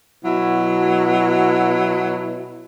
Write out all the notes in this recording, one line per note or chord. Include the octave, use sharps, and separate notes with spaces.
B2 F#3 E4